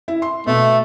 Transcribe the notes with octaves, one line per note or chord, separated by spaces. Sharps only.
E4
C6
B2 A3